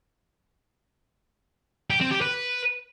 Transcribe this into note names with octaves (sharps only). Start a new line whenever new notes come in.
G4
C4
G4
B4